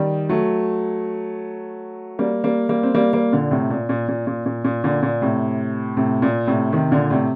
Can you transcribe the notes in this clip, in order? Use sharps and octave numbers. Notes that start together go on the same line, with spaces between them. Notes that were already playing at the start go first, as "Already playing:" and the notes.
Already playing: D#3 G3
F#3 A3
G3 A#3
G3 A#3
G3 A#3
C4
G3 A#3
G3 A#3
A#2 D3
A2 C3
A#2
A#2
A#2
A#2
A#2
A#2
A#2 D3
A#2
A2 C3
A2 C3
A#2
A2 C3
C3 D#3
A#2 D3
A2 C3